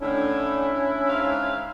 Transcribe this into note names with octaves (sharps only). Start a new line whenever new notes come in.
A2 D3 D#3 C#4 D4 E4
G#2 E5 F5